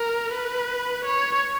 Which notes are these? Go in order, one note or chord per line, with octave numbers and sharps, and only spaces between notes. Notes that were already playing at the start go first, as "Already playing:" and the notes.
Already playing: A#4
B4
C#5